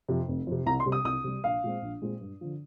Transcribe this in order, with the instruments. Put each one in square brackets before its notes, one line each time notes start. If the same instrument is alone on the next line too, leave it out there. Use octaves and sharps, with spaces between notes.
[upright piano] F2 C3
F1
F2 C3
C2 A#5
C6
C3 G3
D#6
C2 D#6
C3 G3
A#1 F5
A#2 G#3 C4
A#1
A#2 G#3 C4
G2
D3 F3